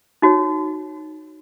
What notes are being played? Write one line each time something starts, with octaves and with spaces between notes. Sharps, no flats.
D#4 F#4 C#5